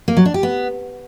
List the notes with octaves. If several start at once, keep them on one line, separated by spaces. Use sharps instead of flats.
A#3
F#3
D4
G4
B3